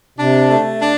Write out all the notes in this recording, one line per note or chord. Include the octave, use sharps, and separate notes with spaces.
C3 D4
A3
D4